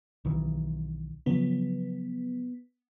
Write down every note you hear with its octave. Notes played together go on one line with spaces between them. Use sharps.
B1 D#3 E3
C#3 F3 F#3 B3